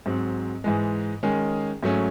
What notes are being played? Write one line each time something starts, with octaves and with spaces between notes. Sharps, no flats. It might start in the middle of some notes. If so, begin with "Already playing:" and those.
G#2 F#3 C4
G#2 E3 G#3
D#3 G#3 C#4 G#4
G#2 F#3 A3 C#4